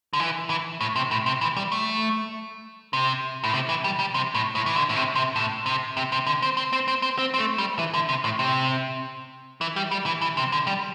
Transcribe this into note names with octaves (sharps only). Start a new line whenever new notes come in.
D3
E3
E3
A2
C3
A2
C3
E3
G3
A3
C3
A2
C3
E3
G3
G3
C3
A2
A2
E3
D3
A2
C3
C3
A2
C3
C3
C3
D3
C4
C4
C4
C4
C4
C4
C4
A3
G3
E3
D3
C3
A2
C3
E3
G3
G3
E3
E3
C3
D3
G3